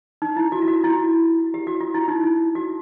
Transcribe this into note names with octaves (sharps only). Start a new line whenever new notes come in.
D#4
E4
F#4
F4
F#4
E4
G4
F#4
F4
E4
D#4
D#4
F#4